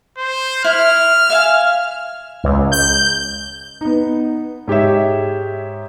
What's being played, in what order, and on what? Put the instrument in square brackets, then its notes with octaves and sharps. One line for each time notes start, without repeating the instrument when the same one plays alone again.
[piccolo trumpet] C5
[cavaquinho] E4 [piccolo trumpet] F6
[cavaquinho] E5 F5 G#5
[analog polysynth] C#2
G6
[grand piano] B3 D#4
G#2 G4 C#5 E5